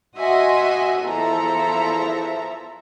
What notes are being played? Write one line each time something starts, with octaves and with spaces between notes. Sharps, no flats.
F#4 D#5 E5 F#5 G#5 C6
E2 F3 E4 A4 E5 A#5